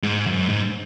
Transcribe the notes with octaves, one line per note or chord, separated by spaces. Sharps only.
G#2
F#2
G#2